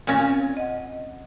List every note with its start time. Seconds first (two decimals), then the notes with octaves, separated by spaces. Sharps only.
0.07 A#2 C4 C#4 F5 A#6
0.57 D#5 F#5